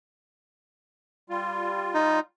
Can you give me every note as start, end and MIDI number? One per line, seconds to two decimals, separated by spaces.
1.30 2.19 55
1.30 2.19 65
1.94 2.20 63